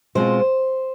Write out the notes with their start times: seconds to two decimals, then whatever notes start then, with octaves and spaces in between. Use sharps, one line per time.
0.15 B2 G#3 C4 F4 C5